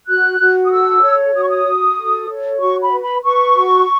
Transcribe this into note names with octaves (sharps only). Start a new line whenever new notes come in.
F#4 F#6
F#4
D#6
A4 E6
C#5
F#4 D#6
C#6
D#6
F#4
A4
C#5
F#4 C#6
B5
B4
B5
B4 C#6
F#4